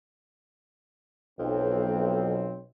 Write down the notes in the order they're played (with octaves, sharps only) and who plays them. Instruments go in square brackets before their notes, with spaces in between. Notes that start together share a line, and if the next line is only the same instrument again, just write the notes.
[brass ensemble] B1 C4 [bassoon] F2